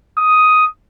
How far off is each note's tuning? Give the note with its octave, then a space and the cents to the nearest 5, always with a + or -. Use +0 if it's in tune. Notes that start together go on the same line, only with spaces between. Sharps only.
D#6 +5